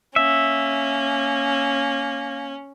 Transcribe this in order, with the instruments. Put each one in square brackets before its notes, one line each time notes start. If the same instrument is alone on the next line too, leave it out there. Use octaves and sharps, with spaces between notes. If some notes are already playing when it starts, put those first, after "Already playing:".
[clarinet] A#3 [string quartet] C#4 [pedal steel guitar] E5